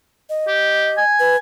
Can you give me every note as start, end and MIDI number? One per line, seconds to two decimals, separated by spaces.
0.30 1.03 75
0.48 0.90 67
0.97 1.37 80
1.20 1.36 71